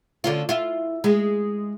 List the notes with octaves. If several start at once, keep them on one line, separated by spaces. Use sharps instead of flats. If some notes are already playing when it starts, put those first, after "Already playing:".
D3 C#4 F4
E4 F4
G#3